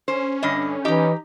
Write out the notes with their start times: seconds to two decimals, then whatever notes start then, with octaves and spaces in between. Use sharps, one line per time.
0.08 C#4 C5
0.43 G2 D3 D#5
0.85 E3 D#4 G4 A#5